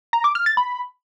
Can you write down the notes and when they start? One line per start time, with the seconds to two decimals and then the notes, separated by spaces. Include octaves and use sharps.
0.13 A#5
0.24 D6
0.35 F6
0.46 A6
0.57 B5